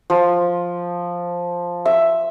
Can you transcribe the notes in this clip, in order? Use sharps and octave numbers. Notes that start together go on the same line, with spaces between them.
F3
E5